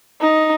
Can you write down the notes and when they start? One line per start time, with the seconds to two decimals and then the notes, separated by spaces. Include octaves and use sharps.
0.21 D#4